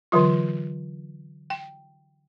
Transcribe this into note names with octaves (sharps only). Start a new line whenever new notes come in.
D3 E3 F#3 F4
G5